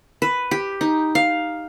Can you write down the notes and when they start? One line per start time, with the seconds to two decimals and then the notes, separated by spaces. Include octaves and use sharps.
0.22 B4
0.51 G4
0.81 D#4
1.15 F5